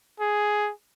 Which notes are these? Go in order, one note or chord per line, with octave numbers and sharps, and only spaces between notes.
G#4